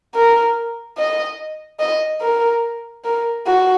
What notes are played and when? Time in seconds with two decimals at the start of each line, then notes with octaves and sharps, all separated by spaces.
0.15 A#4
0.98 D#5
1.79 D#5
2.21 A#4
3.04 A#4
3.46 F#4